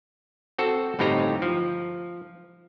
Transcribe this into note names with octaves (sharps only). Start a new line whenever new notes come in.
C4 F#4 A4
G1 A2 C4 D#4 G4 A#5
F3